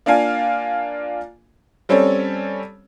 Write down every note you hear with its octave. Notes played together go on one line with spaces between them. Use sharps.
A#3 D4 F4 F5 G#5
G3 C4 C#4 A4 C#5